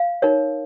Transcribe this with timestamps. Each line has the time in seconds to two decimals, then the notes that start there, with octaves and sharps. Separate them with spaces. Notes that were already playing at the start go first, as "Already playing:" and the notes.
Already playing: F5
0.22 D#4 A#4 C#5